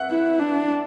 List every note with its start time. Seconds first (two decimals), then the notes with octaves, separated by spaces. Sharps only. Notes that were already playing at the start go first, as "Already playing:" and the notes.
Already playing: E5 F#5 F#6
0.11 E4
0.39 D4